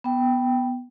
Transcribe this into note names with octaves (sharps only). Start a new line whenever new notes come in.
B3 G5